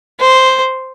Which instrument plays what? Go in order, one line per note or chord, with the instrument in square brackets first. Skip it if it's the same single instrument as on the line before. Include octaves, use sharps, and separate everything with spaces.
[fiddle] C5